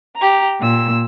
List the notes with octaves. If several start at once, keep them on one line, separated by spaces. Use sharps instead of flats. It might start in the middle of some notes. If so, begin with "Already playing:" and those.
G4 A#5
A#2 E6